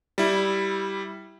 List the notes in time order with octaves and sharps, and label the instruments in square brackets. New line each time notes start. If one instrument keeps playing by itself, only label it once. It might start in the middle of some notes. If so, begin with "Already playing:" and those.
[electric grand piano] G3 E4